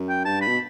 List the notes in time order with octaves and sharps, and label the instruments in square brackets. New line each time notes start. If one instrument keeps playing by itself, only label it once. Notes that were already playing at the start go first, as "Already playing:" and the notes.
Already playing: [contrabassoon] F#2
[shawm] G5
[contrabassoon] G2 [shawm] A5
[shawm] B5
[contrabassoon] B2